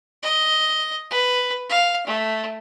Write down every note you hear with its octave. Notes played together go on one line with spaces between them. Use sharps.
D#5
B4
F5
A3